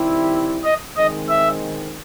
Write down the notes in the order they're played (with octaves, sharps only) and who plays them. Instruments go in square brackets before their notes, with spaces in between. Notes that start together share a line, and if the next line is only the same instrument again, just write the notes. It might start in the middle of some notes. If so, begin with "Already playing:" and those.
Already playing: [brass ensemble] D#3 G3 C4 E4 G4
[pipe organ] D#5
[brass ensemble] D#3 G#3 C4 [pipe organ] D#5
[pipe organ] E5